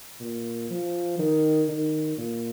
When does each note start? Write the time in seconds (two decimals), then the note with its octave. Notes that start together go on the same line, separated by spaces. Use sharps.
0.20 A#2
0.70 F3
1.19 D#3
1.69 D#3
2.18 A#2